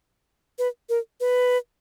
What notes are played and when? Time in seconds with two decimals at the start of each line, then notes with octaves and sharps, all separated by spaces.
0.58 B4
0.89 A#4
1.20 B4